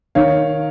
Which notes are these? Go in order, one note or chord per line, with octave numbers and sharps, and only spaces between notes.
D#3 C#5 F5